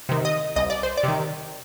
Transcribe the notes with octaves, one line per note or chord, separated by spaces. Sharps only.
C3 D#3
D#5
C2 D#5
D5
C5
D5
C3 D#3